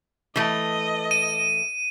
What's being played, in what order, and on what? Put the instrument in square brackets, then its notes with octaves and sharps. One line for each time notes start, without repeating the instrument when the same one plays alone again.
[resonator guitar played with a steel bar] E3 A3 [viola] D#5
[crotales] D#7